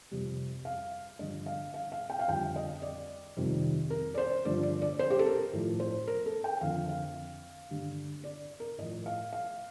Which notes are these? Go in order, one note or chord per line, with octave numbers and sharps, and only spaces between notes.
F2 C3 G3
F5
G2 D3 F3 D#5
F5
F5
F5
G5
F5
F2 D3 G3 G5
D#5
D5
F2 C3 D#3 G3
A#4
D5
C5
G2 D3 F3 D5
D5
D5
C5
G4
A4
A#4
A2 F3
C5
A#4
A4
G5
F2 D3 F3 F5
F5
G2 D3 G3
D5
A#4
A2 F3 D#5
F5
F5